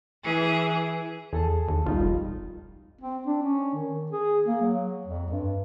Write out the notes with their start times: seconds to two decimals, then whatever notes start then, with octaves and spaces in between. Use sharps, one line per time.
0.23 E3 G#4
1.33 E2 G#4 A4 A5
1.68 D#2
1.86 B1 G3 D#4 F4
2.00 F1
3.01 C4
3.27 D4
3.43 C#4
3.75 D#3
4.12 G#4
4.46 A#3
4.61 F#3
5.07 F2
5.30 G2